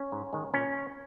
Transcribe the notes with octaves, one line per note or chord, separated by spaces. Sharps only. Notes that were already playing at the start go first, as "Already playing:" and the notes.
Already playing: C#4
G#2
D#3 G#3
A#2 C#4